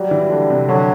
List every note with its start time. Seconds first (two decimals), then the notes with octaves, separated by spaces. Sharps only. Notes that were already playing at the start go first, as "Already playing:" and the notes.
Already playing: F#3 G3
0.11 E3
0.30 D3
0.50 C3
0.69 D3 F#3